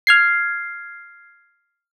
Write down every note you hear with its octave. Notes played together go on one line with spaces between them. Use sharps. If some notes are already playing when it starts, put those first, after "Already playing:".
F6 G#6 C7